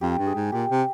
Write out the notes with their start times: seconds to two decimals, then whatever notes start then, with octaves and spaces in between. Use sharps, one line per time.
0.01 F2 G4
0.18 G2
0.27 G#4
0.35 G#2
0.52 A#2 G4
0.70 C3